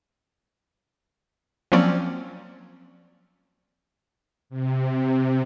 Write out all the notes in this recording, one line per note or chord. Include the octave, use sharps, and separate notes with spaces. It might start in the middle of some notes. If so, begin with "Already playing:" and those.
F3 F#3 A#3 C4 C#4 D5
C3